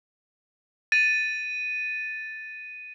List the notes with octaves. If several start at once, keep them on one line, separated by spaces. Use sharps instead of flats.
A6 D#7